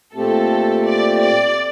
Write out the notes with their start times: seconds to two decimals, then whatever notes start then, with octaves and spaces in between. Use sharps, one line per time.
0.14 A#2 A3 C4 G4 A4
0.85 D5
1.21 D5